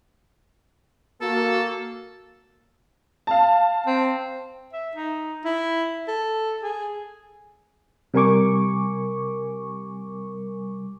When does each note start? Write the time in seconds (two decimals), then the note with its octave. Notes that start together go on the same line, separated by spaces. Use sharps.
1.22 A#3 F#4 A4
3.27 F5 A5
3.86 C4
4.73 E5
4.95 D#4
5.45 E4
6.08 A4
6.63 G#4
8.14 C3 G3 A#4 G#5 C#6 D6